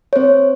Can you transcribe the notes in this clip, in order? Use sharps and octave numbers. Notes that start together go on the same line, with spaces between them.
C#5
C4 C5